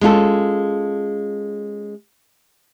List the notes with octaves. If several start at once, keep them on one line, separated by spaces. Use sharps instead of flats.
G#3 C#4 F4 A4